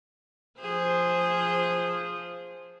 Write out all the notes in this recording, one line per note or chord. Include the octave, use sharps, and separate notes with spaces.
F3 G#4 C5